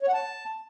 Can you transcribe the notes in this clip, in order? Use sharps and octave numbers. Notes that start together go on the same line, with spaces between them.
C#5
F#5
A5